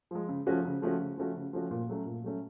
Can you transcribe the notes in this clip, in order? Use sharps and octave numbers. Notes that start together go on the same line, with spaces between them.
F3 G#3
C#3
F3 A3 C#4 F#4
C#3
F3 A3 C#4 F#4
C#3
F3 A3 C#4 F#4
C#3
F3 A3 C#4 F#4
A#2
F#3 A3 C#4
A#2
F#3 A3 C#4